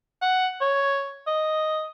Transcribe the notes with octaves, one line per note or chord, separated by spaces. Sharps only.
F#5
C#5
D#5